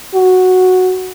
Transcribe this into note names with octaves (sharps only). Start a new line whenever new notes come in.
F#4